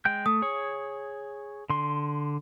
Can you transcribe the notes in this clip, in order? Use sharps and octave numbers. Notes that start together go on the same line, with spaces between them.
G#3 G5 G6
A3 D#6
G#4 C#5
D3 C6